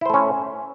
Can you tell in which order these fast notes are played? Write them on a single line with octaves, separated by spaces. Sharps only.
E4 C5 A3 C#4